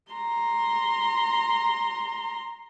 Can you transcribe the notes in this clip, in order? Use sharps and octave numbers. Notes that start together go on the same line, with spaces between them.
A#5 C6